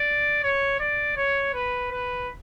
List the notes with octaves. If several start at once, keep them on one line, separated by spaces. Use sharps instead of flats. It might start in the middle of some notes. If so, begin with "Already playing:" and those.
Already playing: D5
C#5
D5
C#5
B4
B4